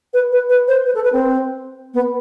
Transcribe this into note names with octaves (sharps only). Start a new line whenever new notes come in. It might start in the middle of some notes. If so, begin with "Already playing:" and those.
B4
B4
B4
C5
B4
A4
B4
C4
B3